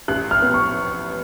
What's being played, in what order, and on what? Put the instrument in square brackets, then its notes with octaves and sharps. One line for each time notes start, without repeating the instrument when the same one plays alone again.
[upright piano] A1 [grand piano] F#6
[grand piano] F6
[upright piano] B3
[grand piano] C#6